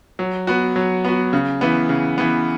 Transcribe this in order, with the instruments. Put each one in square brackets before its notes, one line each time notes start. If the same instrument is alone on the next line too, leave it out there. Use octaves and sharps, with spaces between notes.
[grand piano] F#3
B3 F#4
F#3
B3 F#4
C#3
E3 B3
C#3
E3 B3